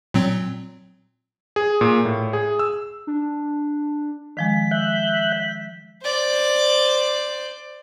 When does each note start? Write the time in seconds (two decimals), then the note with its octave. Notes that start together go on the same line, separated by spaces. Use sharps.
0.14 A#2 F#3 C4
1.56 G#4
1.81 A#2
2.05 A2
2.33 G#4
2.59 E6
3.07 D4
4.37 D#3 F3 G#3 B6
4.71 E5 F#6 G6
6.03 C5 D5